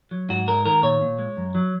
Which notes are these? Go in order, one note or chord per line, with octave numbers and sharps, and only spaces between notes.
F#3
G#2 F#4
G#3 A#4
D#3 A#4
A#2 C#5
A#2
G#3
F#2
F#3